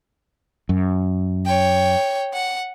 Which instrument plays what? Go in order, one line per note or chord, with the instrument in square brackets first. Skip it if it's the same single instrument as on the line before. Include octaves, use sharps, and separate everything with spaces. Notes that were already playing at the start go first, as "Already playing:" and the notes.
[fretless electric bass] F#2
[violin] C#5 G5
F#5